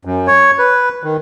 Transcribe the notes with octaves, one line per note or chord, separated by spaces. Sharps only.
F#2
C#5
B4
D#3